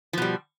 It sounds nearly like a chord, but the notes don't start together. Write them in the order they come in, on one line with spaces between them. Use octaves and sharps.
F3 B2 G3